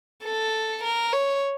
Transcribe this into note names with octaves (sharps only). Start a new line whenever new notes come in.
A4
A#4
C#5